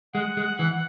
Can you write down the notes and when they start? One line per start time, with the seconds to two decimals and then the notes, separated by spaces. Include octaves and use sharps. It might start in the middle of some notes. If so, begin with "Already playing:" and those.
0.14 G#3 F#5
0.37 G#3
0.59 E3